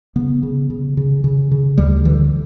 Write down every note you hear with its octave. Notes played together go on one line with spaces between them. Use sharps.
C#3 B3
C#3
C#3
C#3
C#3
C#3
D2 G3
D3 E3